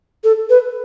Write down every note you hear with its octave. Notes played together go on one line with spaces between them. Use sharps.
A4
B4